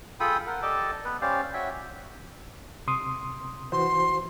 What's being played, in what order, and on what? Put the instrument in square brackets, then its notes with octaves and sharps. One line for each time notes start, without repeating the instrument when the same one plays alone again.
[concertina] F4 G#4 A4 G5 B5 D#6
A#4 F#5
G4 A4 D5 D#5 A5 D6
B3 B4
C#4 G4 C5 D5 F5
C#4 F#4 E5 G5 G#5
[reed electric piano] C3 C6 D#6
[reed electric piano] E3 F#4 C5 [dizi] C6